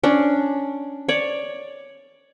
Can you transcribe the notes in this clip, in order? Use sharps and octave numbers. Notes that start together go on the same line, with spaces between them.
C#4 D4
C#5 D5